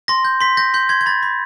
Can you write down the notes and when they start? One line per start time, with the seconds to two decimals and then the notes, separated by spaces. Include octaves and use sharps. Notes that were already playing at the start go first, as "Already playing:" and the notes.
0.08 C6 A#6
0.25 G6
0.41 C6 B6
0.57 G6 A#6
0.74 C6 G6
0.89 C6 G#6
1.01 G#6
1.06 B5 A6
1.23 B5